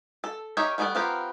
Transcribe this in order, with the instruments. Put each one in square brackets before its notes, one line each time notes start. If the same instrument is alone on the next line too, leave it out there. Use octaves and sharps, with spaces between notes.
[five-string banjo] A4
D#4 G4 A#4 C#5 E5
G3 A3 B3 F4 D5
B3 C4 F4 G4 A#4